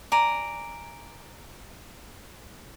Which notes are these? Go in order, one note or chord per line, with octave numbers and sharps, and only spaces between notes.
D5 G#5 A#5